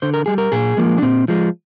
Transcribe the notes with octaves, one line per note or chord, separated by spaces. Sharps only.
D3 C5
A#4
G3 G#4
A#4
A#2 G#4
F3 G#3 A#3
D4
A#2 C4
F3 G#3